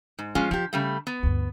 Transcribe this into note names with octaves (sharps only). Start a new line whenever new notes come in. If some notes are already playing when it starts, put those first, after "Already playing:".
G#2
F3 G#3 C#4 F4
F3 D4 G4
C#3 G3 A3
B3
D2 G2